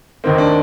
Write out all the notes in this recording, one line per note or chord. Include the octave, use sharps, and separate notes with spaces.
F1 D#2 D#3 A#3 C4
D4